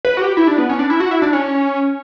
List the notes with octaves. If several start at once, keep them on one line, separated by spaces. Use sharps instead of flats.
B4
F#4
G4
E4
D4
B3
C#4
D4
E4
F#4
E4
D4
C#4